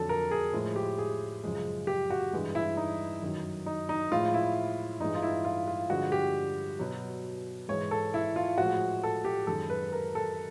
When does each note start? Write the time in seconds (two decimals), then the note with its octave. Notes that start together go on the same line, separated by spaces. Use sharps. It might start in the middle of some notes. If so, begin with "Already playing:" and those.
Already playing: F2 D3 F#3 A4
0.09 A#4
0.31 G#4
0.53 A2 F3 G#3
0.76 G4
0.98 G#4
1.44 F#2 C#3 F3 G#3
1.87 G4
2.10 F#4
2.33 G2 E3 G#3
2.55 E4
2.77 D#4
3.22 F#2 D#3 F#3
3.66 D#4
3.89 D#4
4.12 A2 F3 G#3 F4
4.34 E4
5.00 G2 E3 G#3 D#4
5.15 F4
5.22 E4
5.45 F4
5.67 F4
5.90 G2 D3 F3 G#3 F#4
6.12 G4
6.79 B2 F#3
7.68 G#2 E3 G#3 C#5
7.91 A4
8.14 E4
8.36 F4
8.58 A2 F3 G#3 F#4
9.03 A4
9.25 G4
9.47 F#2 D#3 G#3 A4
9.70 B4
9.93 A#4
10.15 A4